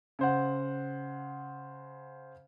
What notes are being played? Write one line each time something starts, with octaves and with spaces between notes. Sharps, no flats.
C#3 C5 F#5